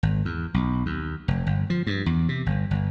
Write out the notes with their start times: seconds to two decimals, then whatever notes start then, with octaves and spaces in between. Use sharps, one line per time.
0.03 G#1
0.25 E2
0.54 B1
0.86 D#2
1.28 F1
1.46 G1
1.70 F3
1.87 G2
2.06 E2
2.29 C3
2.46 G1
2.71 G1